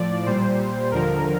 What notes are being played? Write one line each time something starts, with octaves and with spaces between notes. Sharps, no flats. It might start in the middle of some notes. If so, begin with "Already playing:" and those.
Already playing: A2 F3 D5
A#2 G3 C5
D#2 D3 F3 A#4